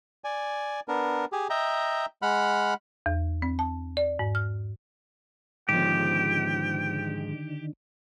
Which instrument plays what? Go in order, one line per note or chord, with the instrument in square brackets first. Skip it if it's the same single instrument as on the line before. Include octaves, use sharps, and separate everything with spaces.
[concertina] D5 G#5
B3 D4 A#4
G4 G#4
D#5 E5 G5 A#5
G#3 F#5 B5 F6
[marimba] E2
C4
A5
D5
G#2
F6
[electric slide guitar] G#2 F3 [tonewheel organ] D3 D#3 [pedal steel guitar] G4 [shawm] G5